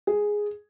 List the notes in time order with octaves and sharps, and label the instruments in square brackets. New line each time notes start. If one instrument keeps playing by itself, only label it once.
[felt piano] G#4